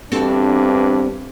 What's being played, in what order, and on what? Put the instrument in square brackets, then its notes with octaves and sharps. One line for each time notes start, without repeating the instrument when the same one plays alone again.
[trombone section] E2 G2 D4 [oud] C4 F#4 A4